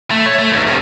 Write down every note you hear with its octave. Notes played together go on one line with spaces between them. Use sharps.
A3
C#5
A3
B1 E2
G2 C3